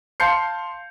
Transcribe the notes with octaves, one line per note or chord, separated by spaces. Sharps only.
F5 A5 C6 G6 C7 C#7